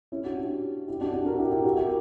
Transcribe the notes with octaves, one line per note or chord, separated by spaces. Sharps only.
C#4 E4
D4 F#4
E4 G4
E4 G4
D4 F#4
D4 F#4
F#4 A#4
E4 G4
E4 G4
F#4 A#4
E4 G4